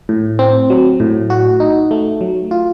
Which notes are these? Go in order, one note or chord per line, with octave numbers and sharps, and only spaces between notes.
A2
C4
F#3
A2
F#4
D#4
A3
F#3
F4